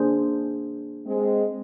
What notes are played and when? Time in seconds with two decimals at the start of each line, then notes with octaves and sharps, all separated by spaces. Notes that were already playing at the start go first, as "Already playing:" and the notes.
Already playing: A#3 D4 G#4 C5
1.06 G#3 C4